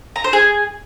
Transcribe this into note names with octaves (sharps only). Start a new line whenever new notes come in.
A#5
C5
G#4